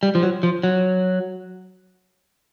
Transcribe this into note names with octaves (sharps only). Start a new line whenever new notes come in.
G3
F3
F#3
F3
F#3